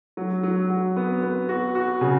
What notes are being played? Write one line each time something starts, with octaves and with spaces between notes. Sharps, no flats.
F#3
F#3
F#3
B3
B3
F#4
F#4
C#3